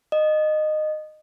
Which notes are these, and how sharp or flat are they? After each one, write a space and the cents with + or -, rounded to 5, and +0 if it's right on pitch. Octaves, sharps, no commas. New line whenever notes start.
D#5 -20